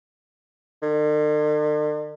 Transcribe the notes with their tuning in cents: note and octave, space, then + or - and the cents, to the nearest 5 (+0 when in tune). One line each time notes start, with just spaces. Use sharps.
D3 +45